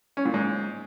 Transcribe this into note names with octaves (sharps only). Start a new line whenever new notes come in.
C#4
A#2
G#2